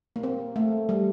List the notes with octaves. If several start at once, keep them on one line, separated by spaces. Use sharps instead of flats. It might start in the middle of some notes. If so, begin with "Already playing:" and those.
A#3
C4
A3
G3